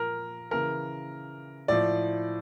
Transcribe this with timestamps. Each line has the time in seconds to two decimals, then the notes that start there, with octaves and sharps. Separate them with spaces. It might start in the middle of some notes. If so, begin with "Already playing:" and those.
Already playing: A#2 F3 A#4
0.51 C#3 E3 A#4
1.68 A2 F3 D5